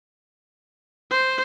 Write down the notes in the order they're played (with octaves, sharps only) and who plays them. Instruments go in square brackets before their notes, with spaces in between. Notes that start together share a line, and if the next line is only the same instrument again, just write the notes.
[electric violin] C5